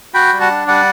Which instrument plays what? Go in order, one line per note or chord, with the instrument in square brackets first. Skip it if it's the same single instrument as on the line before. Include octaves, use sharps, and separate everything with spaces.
[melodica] F#4 G5 B5
G3
F#5 A5
D4
G3 D5 F#5